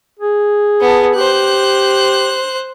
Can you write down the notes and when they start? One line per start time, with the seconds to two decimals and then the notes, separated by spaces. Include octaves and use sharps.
0.19 G#4
0.81 B3 A5
1.16 G4 C5 F#6